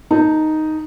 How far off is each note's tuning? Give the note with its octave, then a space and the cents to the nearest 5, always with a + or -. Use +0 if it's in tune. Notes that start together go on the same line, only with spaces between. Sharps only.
D#4 +0 A#4 +0 A5 +25